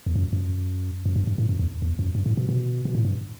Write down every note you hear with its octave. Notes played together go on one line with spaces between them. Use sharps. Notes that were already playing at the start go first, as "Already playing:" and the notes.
E2
F#2
F#2
F#2
G2
G2
A2
F#2
E2
E2
F#2
G2
A2
B2
B2
B2
A2
G2